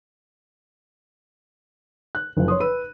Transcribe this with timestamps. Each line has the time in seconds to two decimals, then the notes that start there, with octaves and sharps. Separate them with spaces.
2.15 F#6
2.37 F#1 F3
2.48 C#5 C6 D#6
2.60 B4 B5 E6 D#7